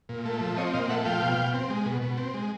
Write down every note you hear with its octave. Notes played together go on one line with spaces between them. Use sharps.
A#2
A3
F3
C4 C#5 D#5
A#2 D#5 F5
A3 E5 F#5
F3 F5 G5
B2
B2
C4
G#3
B2
B2
C4
G#3